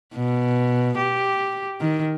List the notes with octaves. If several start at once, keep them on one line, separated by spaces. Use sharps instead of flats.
B2
G4
D#3